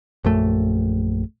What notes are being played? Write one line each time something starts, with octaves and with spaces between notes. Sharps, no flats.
A#1 F#2 A3